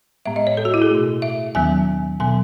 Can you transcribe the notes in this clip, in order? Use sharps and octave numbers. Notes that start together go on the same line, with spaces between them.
A2 G#3 B3 E5
D#5
C#5
A4
F#4
E4
G#4
B2 A3
E5
D#2 D#3 F#3 B3 G#5
B2 F#3 B3 G#5